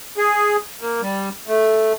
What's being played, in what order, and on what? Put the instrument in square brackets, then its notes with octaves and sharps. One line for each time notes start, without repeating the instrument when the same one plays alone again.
[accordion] G#4
A#3
G3
A3